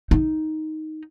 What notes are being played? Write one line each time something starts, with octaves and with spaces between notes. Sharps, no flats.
D#4